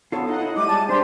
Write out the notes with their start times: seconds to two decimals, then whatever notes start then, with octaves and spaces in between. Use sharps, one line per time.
0.12 B3 F4 A4 C#5
0.27 D#4 D#5 F#5
0.39 E4
0.56 G3 A3 D6 D#7
0.68 G#3 A5
0.89 G3 D4 G4 B4 C5